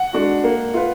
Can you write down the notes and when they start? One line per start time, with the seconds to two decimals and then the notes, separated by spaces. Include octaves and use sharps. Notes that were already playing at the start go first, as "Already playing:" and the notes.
Already playing: F#5
0.13 G#3 D4 F#4
0.44 A#3
0.74 F4 B4